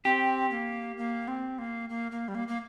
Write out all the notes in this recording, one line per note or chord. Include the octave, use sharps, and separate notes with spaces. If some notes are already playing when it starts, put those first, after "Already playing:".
C4 G4
A#3
A#3
C4
A#3
A#3
A#3
G3
A#3
A#3